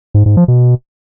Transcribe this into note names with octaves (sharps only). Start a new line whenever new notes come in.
G#2
G#2
F3
B2